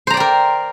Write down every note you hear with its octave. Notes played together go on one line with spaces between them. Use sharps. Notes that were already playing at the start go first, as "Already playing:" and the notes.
A#4 C5 D5 G5 A#5